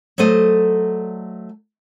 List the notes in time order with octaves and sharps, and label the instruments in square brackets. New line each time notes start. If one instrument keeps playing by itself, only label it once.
[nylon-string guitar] F#3 A3 A4 C5 D5 D#5